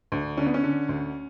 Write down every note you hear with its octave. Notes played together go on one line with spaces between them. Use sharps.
D2
D3 C#4
B3
C#4
D3
D2